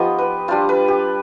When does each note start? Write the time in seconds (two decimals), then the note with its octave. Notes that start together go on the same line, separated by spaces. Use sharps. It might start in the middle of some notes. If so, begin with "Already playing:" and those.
Already playing: F3 B3 D#4 F4 G4 D#5
0.19 B4
0.48 G3 D4 F4 C5
0.69 B4
0.88 G4